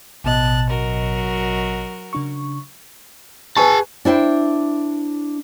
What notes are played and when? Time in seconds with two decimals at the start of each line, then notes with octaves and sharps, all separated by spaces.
0.24 A1 B2 D#5 A5 F#6
0.69 F#3 F#4 A#4
2.13 C#3 D4 C#6
3.57 G#4 B4 G#5 A5 C#6
4.05 D4 E4 C5 G5